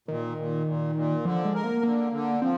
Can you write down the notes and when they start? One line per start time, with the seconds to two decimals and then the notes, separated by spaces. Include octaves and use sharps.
0.08 A#2 D#3
0.37 A#2
0.67 A#2
0.95 A#2
1.25 D3 F3
1.45 G#3
1.55 A#4
1.64 A#3
1.83 D3 A#3
2.12 D3
2.41 F3 C4